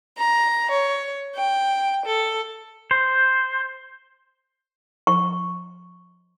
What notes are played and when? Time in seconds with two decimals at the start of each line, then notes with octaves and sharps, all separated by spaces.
0.18 A#5
0.71 C#5
1.36 G5
2.05 A4
2.91 C5
5.07 C#6